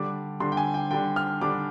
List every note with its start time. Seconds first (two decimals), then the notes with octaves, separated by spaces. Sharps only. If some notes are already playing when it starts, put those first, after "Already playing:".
Already playing: D3 G3 D4 D6
0.40 D3 G3 D4 C6
0.52 G5
0.57 G#5
0.74 G5
0.91 D3 G3 D4 G5
1.16 F6
1.41 D3 G3 D4 D6